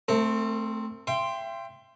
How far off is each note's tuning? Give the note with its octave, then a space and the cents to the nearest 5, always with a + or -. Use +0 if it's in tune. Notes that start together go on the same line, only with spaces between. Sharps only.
A3 +0 C4 +0 A#4 -45
E5 +40 G5 +5 C6 +0